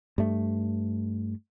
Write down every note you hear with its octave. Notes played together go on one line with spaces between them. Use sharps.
G2 A3